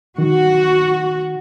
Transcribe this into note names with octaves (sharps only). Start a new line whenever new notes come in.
D#3 F#4